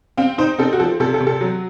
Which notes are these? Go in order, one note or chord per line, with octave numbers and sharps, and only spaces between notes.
C4 F5
D#4 C5
C4 A4
F#4
F3 A4
C3 A4
A4
C3
A4
F#3